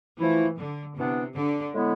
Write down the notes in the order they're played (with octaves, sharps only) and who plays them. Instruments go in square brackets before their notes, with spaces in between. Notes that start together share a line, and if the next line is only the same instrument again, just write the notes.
[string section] E3 [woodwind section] F3 A3 E4
[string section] D3
[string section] C3 [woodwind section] E3 B3 D4
[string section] D3
[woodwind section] A2 G#3 B3 E4